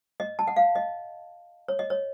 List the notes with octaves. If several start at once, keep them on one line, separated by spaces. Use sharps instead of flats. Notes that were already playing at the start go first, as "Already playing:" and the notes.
D#5
A5
F#5
F5
D#5
C#5
D#5
C#5